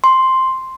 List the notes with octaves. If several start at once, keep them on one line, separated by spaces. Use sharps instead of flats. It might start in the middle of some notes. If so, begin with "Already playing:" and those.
C6